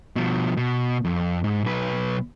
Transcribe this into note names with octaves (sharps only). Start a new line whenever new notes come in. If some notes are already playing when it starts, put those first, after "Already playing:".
B2 F3
B2
F2
G#2
B1 B4